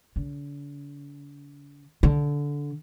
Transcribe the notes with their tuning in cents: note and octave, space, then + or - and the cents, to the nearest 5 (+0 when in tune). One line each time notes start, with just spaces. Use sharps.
D3 -45
D3 -15